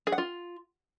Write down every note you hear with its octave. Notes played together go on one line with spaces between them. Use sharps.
G#4
F#5
F4